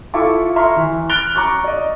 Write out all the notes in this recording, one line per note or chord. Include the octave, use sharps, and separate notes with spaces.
E4 F4 A4 A5 C#6 D6
E5 A#5 C6 C#6 F6
E3
F6 F#6 A6 D7 F7 G7
A#5 C#6 D6 F#6
D5 D#5